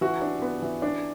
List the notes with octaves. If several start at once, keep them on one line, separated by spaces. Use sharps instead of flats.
E3 F#4
D4
B3
E3
D4